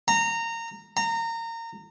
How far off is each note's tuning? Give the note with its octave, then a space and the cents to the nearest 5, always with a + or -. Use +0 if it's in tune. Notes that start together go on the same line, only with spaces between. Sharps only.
A#5 -20
A#5 -25